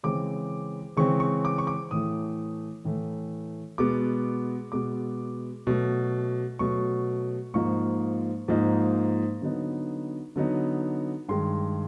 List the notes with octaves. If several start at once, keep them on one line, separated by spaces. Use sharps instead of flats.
C#3 E3 G#3 C4 D6
C#3 E3 G#3 C4 C#6
C#6
D6
C#6
D6
A2 E3 A3 D#6
A2 E3 A3
B2 G#3 B3 D6
B2 G#3 B3 D6
B2 F#3 A3
B2 F#3 A3 C#6
G#2 F3 A#3 D#4 C#6
G#2 F3 A#3 D#4
D3 F#3 B3 D#4
D3 F#3 B3 D#4
G2 D#3 G#3 C6